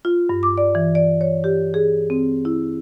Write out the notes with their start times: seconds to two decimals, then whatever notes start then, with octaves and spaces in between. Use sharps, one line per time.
0.05 F4
0.29 G2
0.43 D6
0.58 D5
0.75 E3
0.95 D5
1.21 C#5
1.44 G4
1.74 G#4
2.10 C4
2.45 E4